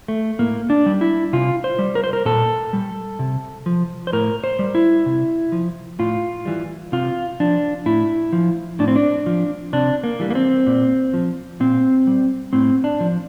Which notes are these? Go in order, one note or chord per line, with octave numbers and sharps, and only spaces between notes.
A3
A2 A#3
D4
G3
E4
C3 F4
C5
G3
A#4
C5
A#4
A#2 A4
G3
C3
F3
C5
A2 A#4
C5
G3
E4
C3
F3
A2 F4
E3 G3
C3 F4
F3 D4
A2 E4
F3
A2 D4
C4
D4
F3
C3 D4
A#3
E3 G3
A#3
C4
A#2
F3
A#2 C4
G3
A2 C4
D4
F3